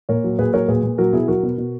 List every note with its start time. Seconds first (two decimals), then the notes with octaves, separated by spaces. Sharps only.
0.09 A#2 A#4 C#5
0.24 F#3
0.39 A#2 G#4 B4
0.53 F#3 A#4 C#5
0.68 A#2 G#4 B4
0.83 A#2
0.98 F#3 F#4 A#4
1.13 B2 E4 G#4
1.28 F#3 F#4 A#4
1.43 B2
1.58 B2